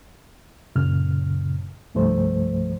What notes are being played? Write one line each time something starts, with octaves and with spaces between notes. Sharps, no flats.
F#2 A#2 C#3 F6
C2 G2 F3 A3 C5